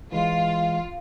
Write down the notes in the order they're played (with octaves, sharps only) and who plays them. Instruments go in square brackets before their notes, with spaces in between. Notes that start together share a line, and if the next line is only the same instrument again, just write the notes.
[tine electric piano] E3 G#3 [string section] F4